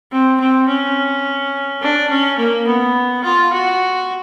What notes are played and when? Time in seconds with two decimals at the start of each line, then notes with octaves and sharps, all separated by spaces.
0.11 C4
0.40 C4
0.68 C#4
1.81 D4
2.10 C#4
2.38 A#3
2.67 B3
3.24 F4
3.53 F#4